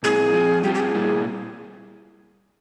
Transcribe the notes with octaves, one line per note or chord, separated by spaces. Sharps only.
A#2 G#3 C4 E4 G#4
F3 C4 F4
G3 C4 F4 G4
G4
G#4
A#2 G3 A#3 E4